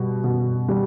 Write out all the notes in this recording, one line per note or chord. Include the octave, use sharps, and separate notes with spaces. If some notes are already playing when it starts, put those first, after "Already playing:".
Already playing: B2 G3
B2
G3